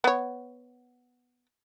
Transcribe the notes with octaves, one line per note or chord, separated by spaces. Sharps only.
B3 C#5